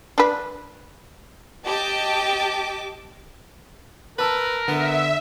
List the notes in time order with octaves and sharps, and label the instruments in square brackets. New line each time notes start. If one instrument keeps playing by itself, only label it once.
[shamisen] D4 B4
[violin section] G4 D#5 G5 A5 D6
[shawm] A#4 [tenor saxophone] B4 [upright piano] A5 E6
[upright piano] D3 [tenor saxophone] B3 [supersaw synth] E5